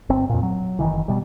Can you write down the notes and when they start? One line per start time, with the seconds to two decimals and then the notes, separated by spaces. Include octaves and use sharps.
0.10 G1 C4
0.29 F2 A#2
0.43 F#3
0.79 F#1 C#2 D#3 E3
1.08 B2 G3